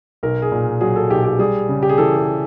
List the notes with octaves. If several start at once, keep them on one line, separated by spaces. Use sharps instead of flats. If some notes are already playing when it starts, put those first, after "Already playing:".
B1 A#4
G#4
A#2
F#3 G#4
A4
B1 G4
G4
G3 G#4
C#3
G4
G#4
E3 A4
A4